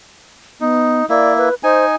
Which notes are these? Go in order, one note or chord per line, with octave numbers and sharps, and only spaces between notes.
B3 D#4
A#3 E4 D5
B4
D#4 C5 G#5